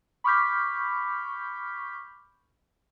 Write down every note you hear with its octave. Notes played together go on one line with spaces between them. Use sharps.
B5 C#6 D6 F6 G6 B6